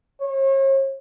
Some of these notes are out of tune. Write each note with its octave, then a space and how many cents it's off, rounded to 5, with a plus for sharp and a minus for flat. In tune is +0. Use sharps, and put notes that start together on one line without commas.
C#5 -40